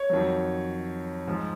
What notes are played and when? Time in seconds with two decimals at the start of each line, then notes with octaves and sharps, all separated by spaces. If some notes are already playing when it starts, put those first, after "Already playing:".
Already playing: C#5
0.10 F2 D#3 F#3
1.27 G#2 F3